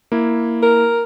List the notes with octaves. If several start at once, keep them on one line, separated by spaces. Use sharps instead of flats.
A#3 E4
A#4